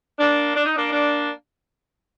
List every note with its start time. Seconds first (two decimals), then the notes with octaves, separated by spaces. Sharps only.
0.18 A#3 D4
0.55 D4
0.65 D#4
0.76 A#3 D4
0.91 A#3 D4